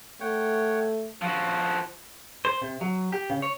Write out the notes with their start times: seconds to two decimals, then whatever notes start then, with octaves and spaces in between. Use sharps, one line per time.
0.21 A3 C#5 F#5 G5
1.22 F3 F#4
2.45 C5
2.62 C3
2.81 F#3
3.13 G4
3.30 C#3
3.42 C#5